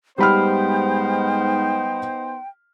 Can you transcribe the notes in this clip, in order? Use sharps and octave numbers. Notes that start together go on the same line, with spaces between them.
G#2 G3 B3 D#4 C5 G5 B5 F6